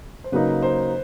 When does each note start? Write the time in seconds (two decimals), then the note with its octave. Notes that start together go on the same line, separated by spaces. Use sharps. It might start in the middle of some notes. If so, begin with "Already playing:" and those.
0.24 C5
0.32 C#3 F#3 A#3 D#4 B4
0.63 C5